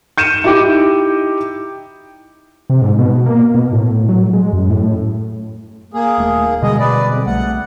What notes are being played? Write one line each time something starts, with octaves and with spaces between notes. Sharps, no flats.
G6 C#7 D#7 E7
D#4 E4 G4 G5 D6
C3
G#2
B2
B2
A#3
B2
A2
F#3
G#3
F#2
A2
A#3 G#4
D#1 A3
B2 D3 G3 G#3 G#4 D#5
B4 D5
F2
B1 A3 F#5